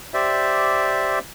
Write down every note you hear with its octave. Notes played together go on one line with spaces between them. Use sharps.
G4 C5 D5 E5